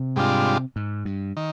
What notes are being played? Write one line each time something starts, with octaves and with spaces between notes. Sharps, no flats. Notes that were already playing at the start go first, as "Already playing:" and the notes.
Already playing: C3
G#2 G3 D4 F4
G#2
G2
D#3